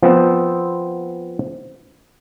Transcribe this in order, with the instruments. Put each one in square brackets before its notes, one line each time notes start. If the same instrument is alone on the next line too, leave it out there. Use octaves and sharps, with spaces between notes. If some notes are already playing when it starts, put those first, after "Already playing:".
[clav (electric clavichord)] F3 B3 C4